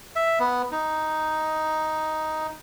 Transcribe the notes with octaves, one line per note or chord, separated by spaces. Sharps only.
E5
B3
D#4